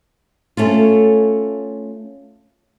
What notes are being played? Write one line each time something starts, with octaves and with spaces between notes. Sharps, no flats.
A3 C#4 F4